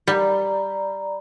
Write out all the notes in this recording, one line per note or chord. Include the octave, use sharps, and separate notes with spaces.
G3 D5 A#5 B5